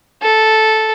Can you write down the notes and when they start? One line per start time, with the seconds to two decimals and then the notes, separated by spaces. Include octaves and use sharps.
0.22 A4